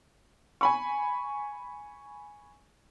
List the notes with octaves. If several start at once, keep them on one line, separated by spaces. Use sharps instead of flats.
G#5 B5 C#6